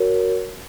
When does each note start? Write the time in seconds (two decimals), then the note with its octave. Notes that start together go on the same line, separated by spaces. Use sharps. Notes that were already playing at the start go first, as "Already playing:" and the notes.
Already playing: F#4 A#4 C#5